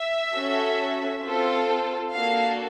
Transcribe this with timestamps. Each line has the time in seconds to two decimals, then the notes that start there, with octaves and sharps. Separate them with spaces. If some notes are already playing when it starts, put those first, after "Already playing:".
Already playing: E5
0.33 C#4 F#4 A4
1.23 C4 F4 A4
2.13 A#3 D4 F#4 A4 F5